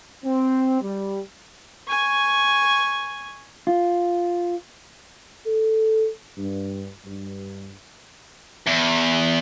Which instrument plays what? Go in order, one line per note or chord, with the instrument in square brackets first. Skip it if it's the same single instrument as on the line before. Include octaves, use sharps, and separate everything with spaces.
[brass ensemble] C4
G3
[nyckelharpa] G#5 C#6
[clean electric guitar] F4
[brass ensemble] A4
G2
G2
[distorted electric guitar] E2